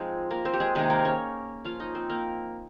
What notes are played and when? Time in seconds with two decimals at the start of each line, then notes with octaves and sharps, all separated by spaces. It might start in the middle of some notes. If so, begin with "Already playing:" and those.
Already playing: F3 G#3 C4 D#4 G#4
0.30 A#3 A#4
0.45 C4 C5
0.53 G4
0.60 G#3 G#4
0.75 C3 D#3 G#3 A#3 D#4 G#4
0.90 A#3 A#4
1.05 C#4 C#5
1.64 F3 A#3 C#4 F4 F5
1.80 D#4 D#5
1.95 C4 C5
2.10 A#3 A#4